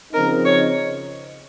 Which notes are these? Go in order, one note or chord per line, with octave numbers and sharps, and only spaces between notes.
C#3 F3 C4 D#4 A#4
C#5